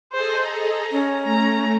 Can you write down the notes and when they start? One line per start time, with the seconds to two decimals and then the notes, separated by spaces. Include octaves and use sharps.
0.13 G#4 A4 C5 D#5
0.47 A#5
0.91 C#4
1.24 A3 A#5